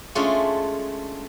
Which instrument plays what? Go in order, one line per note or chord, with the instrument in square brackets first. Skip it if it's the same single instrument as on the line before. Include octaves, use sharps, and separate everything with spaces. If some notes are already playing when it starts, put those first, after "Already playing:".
[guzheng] G#3 A3 C#4 D4 F4 G#4